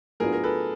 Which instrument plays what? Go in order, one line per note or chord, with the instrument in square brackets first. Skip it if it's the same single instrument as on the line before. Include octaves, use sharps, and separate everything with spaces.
[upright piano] A2 F#3 B3 D4 F4 [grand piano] G#4 A#4
[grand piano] A#4
A4 B4